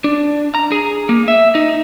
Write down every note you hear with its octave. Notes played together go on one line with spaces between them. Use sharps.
D4
A#5
G#4
A#3
E5
D#4